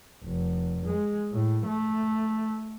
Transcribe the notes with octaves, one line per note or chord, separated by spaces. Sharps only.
F1
G#3
A2
A3